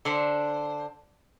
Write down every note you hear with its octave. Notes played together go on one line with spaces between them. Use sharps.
D3 D4 C5